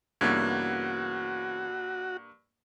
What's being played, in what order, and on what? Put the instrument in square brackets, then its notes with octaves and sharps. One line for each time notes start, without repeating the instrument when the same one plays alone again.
[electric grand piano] G2 A#3 [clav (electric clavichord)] C#3 E3 B3 [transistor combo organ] F#4 [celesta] G#6